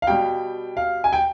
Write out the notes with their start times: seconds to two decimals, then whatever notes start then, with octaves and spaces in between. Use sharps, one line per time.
0.02 F5
0.07 B2 G3 G5
0.77 F5
1.04 G#5
1.13 G5